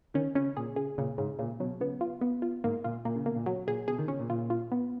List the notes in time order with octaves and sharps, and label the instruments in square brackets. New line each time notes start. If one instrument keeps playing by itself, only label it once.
[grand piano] D#3 [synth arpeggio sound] C#4
[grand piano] C#3 [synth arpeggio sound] C#4
[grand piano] A#2 [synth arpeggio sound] G#4
[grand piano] C#3 [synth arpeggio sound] G#4
[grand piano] A#2 [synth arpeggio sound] C#3
[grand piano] G#2 [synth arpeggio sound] C#3
[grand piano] A#2 [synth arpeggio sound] C#3
[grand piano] B2 [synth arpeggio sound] F#3
[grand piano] C#3 [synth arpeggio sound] B3
[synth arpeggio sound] F4
B3
F4
[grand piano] G#2 [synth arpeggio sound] A#3
[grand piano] A#2 [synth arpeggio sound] F4
[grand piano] A#2 [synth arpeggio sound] A#3
[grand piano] C#3
[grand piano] B2 [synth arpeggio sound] A#3
[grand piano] A#2
[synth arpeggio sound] F#3
[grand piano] A#2 [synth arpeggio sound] G#4
[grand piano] B2 [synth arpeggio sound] G#4
[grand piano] D#3
[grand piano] C#3 [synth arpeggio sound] C#4
[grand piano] A#2
[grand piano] A#2 [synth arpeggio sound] F4
[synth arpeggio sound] F4
B3